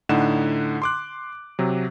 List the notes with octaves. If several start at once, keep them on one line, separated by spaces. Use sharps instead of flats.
A2 D3 D#4 F#5 E7
C6 D6 F#6
C3 F#3